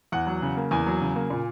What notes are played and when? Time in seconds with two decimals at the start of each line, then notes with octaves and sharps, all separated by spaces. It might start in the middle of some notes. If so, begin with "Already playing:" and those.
0.12 E2 F#5
0.27 F#3
0.42 C#3
0.57 A#3
0.71 E2 G#5
0.86 F#3
1.01 C#3
1.16 A#3
1.30 A#2